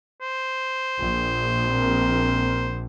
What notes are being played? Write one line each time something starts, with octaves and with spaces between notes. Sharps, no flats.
C5
A#1
C4 A#4